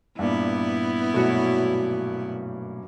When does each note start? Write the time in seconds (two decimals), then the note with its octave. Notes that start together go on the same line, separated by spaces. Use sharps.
0.19 G2 A#2 B3 E4
1.14 F#2 B2 A3 F#4 C#5